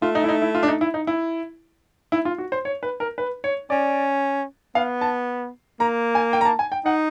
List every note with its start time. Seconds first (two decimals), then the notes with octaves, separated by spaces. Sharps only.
0.02 A3 F4
0.15 D#4
0.24 E4
0.29 D#4
0.42 E4
0.55 F4
0.63 D4
0.68 D#4
0.81 E4
0.94 D#4
1.07 E4
2.12 E4
2.25 F4
2.38 F#4
2.52 C5
2.65 C#5
2.83 B4
3.00 A#4
3.18 B4
3.44 C#5
3.70 C#4 D5
4.75 B3 F5
5.01 A5
5.80 A#3 A#5
6.15 G#5
6.33 G5
6.41 A#5
6.45 A5
6.59 G#5
6.72 G5
6.85 D#4 F#5